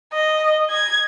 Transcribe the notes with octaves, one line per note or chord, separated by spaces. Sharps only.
D#5
G#6